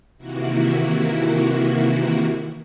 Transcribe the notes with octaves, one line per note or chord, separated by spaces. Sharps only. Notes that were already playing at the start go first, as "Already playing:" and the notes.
C3 D#3 E3 A#3 E4 F#4